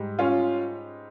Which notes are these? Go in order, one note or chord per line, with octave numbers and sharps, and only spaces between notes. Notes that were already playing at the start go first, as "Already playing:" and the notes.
Already playing: G#2 G3
C#4 F4